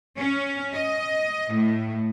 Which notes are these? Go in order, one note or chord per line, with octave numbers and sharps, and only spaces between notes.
C#4
D#5
A2